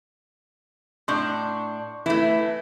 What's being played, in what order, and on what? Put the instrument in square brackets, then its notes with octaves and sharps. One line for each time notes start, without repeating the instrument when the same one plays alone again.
[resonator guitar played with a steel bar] A2 D4 [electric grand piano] C6 C#6 G6
[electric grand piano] E3 [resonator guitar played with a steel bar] A3 E4